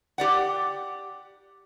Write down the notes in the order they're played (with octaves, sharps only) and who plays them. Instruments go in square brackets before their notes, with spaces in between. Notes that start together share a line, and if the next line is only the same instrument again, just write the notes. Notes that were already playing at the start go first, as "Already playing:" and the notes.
[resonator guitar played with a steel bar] G4 D5 F#5